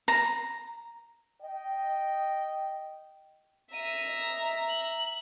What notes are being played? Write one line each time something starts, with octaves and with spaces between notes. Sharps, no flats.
A#5
D#5 G5
E5 A#5 D#7
D#5
F#7